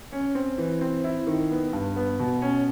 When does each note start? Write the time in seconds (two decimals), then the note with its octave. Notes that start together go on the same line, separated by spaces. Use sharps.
0.12 C#4
0.35 C4
0.58 E3
0.81 C4
1.04 E4
1.27 D#3
1.50 B3
1.73 G2
1.96 B3
2.19 B2
2.42 C#4